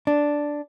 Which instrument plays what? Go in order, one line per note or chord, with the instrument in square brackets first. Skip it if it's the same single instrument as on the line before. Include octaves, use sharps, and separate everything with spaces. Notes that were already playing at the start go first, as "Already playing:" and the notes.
[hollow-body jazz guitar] D4